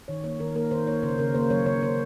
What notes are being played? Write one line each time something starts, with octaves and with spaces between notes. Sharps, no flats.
D#3 C#5
A#3 C#5
D#3 A#4
A#3 A#4
D#3 C5
A#3 C#5
C#3 C5
C#3 A#4
A#3 C5
F#3 C#5
C#3 C#5
C#3 C5